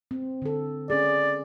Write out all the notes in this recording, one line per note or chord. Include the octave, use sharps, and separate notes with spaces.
C4
D3 A4
C#4 G#4 D5